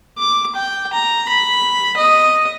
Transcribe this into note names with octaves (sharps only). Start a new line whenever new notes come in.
D6
G5
A#5
B5
D#5